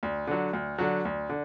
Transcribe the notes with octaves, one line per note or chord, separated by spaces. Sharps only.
D2
D3 F#3
D2
D3 F#3
D2
D3